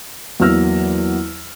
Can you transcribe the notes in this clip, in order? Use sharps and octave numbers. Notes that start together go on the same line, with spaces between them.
E2 F#3 A#3 E6 F6 A#6